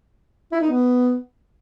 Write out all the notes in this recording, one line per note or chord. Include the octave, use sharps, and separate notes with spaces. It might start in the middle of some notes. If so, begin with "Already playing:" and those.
E4
D#4
B3